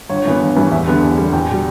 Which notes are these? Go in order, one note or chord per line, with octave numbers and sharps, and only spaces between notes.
G1 C#5
G2 E3 B3
G1
G2 E3 B3
E2 E5
D3 G3 B3
E2
D3 G3 B3
E2 G5
B2 G3